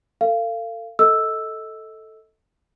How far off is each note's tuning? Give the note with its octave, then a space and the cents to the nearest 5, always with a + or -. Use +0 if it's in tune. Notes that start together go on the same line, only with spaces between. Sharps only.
A4 +35 F5 -25
A4 +0 D#5 +30 E6 +0